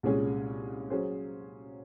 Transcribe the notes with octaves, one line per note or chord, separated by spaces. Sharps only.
C2 A#2 G#3 C#4 G#4
F#3 C#4 G#4 C5